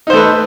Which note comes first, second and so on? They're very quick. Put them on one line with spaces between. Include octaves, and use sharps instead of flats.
D#4 C5 A3 B4